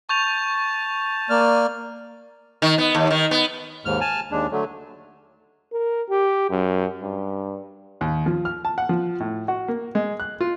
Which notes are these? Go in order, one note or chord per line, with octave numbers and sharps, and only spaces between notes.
A5 C#6 G6 F7
A#3 D5 F6
D#3
B3
D#2
D#3
B3
D#2 G#2 F6
G#5 A5 F6
D#2 G#3 D4
D3 F#3 A3
A#4
G4
F#2
G2
D#2
F3
F6
A5
F#5
F3
A2
F#4
A#3
G#3
F#6
F4